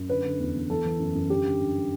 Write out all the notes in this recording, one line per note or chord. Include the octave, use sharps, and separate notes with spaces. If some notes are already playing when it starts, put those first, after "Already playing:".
Already playing: F#2
D3 B4
D3
E2
E2
E3 A4
E3
F#2
F#2
D3 G4
D3
G2